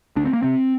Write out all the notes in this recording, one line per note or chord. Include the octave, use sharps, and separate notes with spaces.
D2 D4
C4
A#3
C3 C4